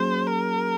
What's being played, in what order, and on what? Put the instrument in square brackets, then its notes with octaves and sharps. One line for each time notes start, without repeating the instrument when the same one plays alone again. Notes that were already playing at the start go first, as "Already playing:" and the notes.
Already playing: [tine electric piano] F#3 A#3 C#4 G#4 [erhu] C5
[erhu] A#4